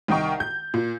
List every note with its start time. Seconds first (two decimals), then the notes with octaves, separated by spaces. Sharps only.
0.08 C2 D#3 D#5 G5 C#6
0.40 G6
0.74 A#2